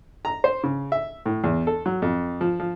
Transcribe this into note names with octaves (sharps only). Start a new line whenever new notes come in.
A#5
C5
C#3
E5
A2
E2
A4
F#3
F2
F3
F3